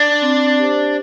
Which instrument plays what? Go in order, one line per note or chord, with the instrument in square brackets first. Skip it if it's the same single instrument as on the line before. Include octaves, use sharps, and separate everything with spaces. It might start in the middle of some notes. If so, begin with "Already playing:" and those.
Already playing: [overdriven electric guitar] D4
[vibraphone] C4
G4 C5